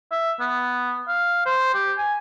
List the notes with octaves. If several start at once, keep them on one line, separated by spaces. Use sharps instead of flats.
E5
B3
F5
C5
G4
G#5